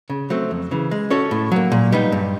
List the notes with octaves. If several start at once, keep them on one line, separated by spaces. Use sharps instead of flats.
C#3
F#3 A3 C4
F2
C#3 E3
G#3
C#4 F#4 A4 C#5
A2
F#3 A#3
A#2
G3 B3 D#4
G2